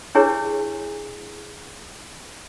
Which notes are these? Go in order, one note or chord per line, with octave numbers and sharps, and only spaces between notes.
D4 E4 G4 G#4 B4 C#5